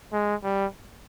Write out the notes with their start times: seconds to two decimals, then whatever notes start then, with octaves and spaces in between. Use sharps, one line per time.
0.13 G#3
0.44 G3